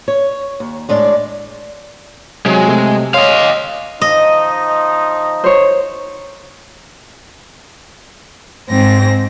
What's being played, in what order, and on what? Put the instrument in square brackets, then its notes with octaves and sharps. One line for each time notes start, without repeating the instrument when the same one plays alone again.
[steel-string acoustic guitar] C#5
D#2
A2 G#3 D4 D5
[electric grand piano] C3 F#3 [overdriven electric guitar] G#3
[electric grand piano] C3 A3
[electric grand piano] C#5 C6 [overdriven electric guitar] D#5 F5
[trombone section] F3 D#4 [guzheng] D#5
[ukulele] C5 C#5
[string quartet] G#2 C4 A#6